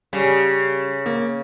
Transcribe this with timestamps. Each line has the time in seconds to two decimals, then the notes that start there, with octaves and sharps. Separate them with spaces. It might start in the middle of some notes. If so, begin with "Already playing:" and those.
0.13 C#3 G3
1.06 A#3